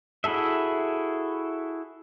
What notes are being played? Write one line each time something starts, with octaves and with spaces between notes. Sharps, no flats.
E4 F#4 G#4 A4 E5